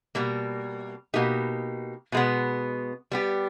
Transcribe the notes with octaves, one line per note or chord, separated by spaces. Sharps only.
B2 G3 A#3
B2 A#3 D#4 G4
B2 G#3 B3
G3 B3 G4